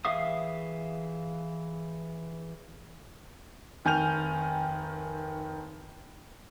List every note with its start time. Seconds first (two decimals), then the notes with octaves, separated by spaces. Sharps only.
0.05 E3 G#4 E5 F5 D#6
3.85 F1 D#3 G#5 F6 G6 F7